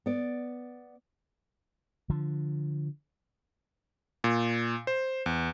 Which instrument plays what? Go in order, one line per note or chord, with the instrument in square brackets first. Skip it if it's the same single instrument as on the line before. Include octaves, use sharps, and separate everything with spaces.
[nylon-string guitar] B3 D5
[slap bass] D3 F3
[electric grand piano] A#2
C5
E2